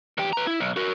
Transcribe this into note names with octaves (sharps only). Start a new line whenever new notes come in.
E2 G4
B4 A#5
E4
B1
F#4 A#4